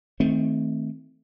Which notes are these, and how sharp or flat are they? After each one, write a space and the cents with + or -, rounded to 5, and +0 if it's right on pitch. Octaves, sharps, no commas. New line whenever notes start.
D#3 +25 A3 +0 C4 +0